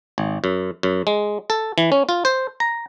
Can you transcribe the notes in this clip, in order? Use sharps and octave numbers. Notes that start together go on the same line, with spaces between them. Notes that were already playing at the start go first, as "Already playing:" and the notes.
G#1
F#2
F#2
G#3
A4
E3
C#4
F4
C5
A#5